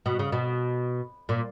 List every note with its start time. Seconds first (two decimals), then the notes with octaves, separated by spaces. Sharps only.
0.06 B2
0.19 C#3
0.32 B2
1.29 A#2